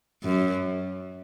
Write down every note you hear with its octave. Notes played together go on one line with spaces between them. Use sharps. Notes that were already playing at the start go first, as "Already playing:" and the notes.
F#2